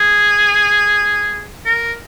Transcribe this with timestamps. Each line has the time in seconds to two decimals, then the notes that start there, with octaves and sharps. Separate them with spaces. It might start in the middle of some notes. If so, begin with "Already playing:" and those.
Already playing: G#4
1.66 A#4